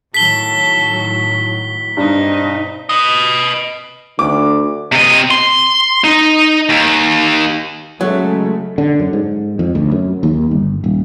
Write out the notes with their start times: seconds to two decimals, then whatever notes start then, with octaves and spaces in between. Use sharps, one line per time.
0.14 A2 D#3 F#3 A4 B6 G7
1.97 G2 B2 C4 D#4
2.89 B4 D#5
4.19 D2 D3 D6
4.92 C3 D#5
5.31 C6
6.04 D#4
6.69 D#2
8.01 C#3 F#3 G#3 A3
8.78 D3
9.00 F#2
9.13 G#2
9.59 F2
9.75 D2
9.91 F#2
10.23 D#2
10.51 G1
10.84 D#1